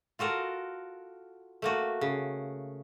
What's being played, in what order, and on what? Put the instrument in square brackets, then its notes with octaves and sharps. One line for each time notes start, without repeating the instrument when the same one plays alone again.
[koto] F4 F#4 A4 A#4
A3 A#3 F#4
C#3